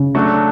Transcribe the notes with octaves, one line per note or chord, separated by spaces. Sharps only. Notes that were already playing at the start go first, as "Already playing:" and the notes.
Already playing: C#3
F#3 A3 D4 F#4